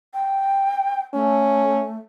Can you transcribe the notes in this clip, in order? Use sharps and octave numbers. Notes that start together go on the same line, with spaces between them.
G5
A3 C#4